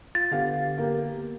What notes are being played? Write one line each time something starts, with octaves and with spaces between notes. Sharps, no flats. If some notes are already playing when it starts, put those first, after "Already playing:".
F4 A6
D3 B3 G4 F5
A#3 G4